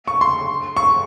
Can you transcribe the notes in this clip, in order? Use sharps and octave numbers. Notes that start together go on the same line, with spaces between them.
C#6
C6
C#6